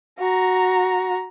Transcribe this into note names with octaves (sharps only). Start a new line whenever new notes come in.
F#4 A#5